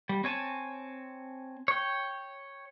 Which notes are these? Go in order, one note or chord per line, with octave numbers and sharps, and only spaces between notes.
G3
C4 C#5 G#5 A5
C#5 G5